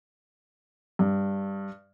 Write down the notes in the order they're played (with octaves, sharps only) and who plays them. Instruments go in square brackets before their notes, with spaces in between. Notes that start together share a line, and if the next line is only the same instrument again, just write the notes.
[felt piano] G2